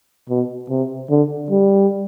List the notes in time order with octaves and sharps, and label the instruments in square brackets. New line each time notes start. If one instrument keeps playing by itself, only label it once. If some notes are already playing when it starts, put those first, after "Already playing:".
[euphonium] B2
C3
D3
G3